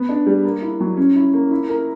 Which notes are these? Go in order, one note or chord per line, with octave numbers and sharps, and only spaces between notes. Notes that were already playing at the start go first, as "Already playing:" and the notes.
Already playing: B3
D4
G3
A#3
E4
F#3
C#4
E4
A#3
E4
A#4